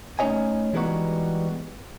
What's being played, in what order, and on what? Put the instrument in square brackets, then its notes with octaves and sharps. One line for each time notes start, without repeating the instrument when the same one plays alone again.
[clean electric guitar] A3 C#4 D#4 C#5 D#5 G#5
E3 G3 G#3 B3 D#4 F#4